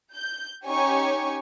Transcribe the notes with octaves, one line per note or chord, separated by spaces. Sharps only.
G6
C#4 D#4 G4 C#5 G#5 C#6